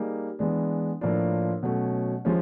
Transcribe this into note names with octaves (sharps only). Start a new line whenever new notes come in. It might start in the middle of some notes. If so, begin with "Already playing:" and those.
Already playing: G3 A#3 D#4 G#4
E3 G#3 B3 D4
A2 F3 A#3 D4 F4
B2 F#3 A3 C#4
F3 G#3 C#4